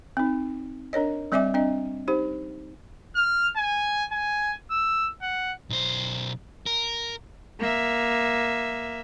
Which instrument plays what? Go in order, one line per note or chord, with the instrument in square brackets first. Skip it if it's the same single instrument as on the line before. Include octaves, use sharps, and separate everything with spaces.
[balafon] C4 D#4
D4 A#4 C#5 D#5
G3 C4 D5 E5 G#5 D6
C4 D4 D#5
D#4 G4 C5
[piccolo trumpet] F6
G#5
G#5
E6
F#5
[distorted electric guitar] B1 C5
A#4
[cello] A#3 E5